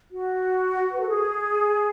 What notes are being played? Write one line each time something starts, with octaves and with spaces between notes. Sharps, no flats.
F#4
B4
A4
G#4